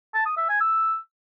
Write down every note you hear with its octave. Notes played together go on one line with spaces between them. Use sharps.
A5
D#6
E5
G#5
E6